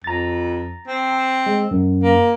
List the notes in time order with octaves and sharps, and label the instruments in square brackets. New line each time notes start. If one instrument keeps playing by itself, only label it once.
[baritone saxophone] F2 [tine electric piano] A#5 A6
[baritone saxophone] C4
[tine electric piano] G#3
F#2
[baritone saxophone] A#3